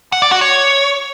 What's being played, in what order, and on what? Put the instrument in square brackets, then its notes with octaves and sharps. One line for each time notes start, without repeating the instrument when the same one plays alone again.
[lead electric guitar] F#5
D5
F#4
C#5